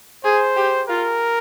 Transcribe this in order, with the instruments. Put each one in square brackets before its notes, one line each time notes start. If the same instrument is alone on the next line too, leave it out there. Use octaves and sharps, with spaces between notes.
[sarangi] G#4 [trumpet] C5
[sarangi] G4
[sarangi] F4 [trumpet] A#4